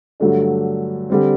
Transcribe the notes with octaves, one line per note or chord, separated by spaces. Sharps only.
G2 D3 F#3 A3 D4
D3 G3 C4